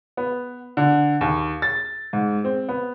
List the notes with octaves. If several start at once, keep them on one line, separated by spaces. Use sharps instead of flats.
B3
D3
D#2
A6
G#2
C4
B3